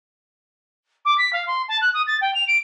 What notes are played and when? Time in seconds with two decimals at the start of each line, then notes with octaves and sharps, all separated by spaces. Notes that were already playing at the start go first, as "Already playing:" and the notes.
1.05 D6
1.18 B6
1.33 F5
1.47 C6
1.68 A5
1.81 F#6
1.94 D#6
2.07 A6
2.21 G5
2.34 F7
2.48 D7